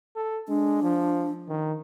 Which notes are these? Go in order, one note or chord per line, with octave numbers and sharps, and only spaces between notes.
A4
G#3 D4
F3
D#3